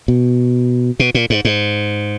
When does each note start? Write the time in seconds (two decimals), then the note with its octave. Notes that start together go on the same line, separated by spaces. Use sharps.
0.08 B2
1.00 B2
1.15 A#2
1.30 G#2
1.45 G#2